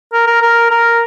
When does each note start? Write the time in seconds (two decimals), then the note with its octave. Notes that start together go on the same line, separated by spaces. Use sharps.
0.13 A#4
0.27 A#4
0.42 A#4
0.71 A#4